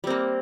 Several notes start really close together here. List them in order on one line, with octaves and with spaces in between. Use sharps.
G3 C4 A#3